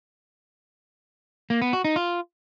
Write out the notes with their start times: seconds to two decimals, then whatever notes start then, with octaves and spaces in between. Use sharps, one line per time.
1.50 A#3
1.62 B3
1.73 F#4
1.85 D#4
1.96 F4